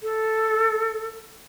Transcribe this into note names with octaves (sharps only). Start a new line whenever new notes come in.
A4